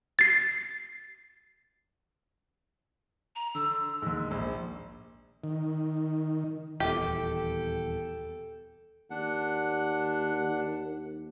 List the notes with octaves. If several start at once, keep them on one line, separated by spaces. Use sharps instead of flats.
A6 C7
A#5
D3 E6
D#2 G#2
A#1
D#3
D#1 E2 G4 A4 G5
D#2 D4 F#5